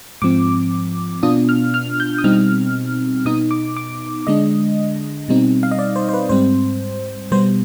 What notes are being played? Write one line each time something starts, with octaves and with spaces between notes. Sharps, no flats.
G#2 F3 C4 D6
B2 B3 D4 F4 D#6
F6
F6
G6
D#6
B2 G3 C4 D#4 F6
B2 B3 D#4 D#6
D6
D6
D3 G#3 D4 D#5
B2 G3 C4 D#4
F5
D#5
D5
C5
C5
B4
G#2 G3 C4 C5
B2 G3 B3 C5